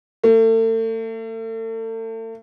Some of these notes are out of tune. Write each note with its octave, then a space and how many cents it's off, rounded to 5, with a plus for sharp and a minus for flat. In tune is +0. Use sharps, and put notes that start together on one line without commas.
A3 +40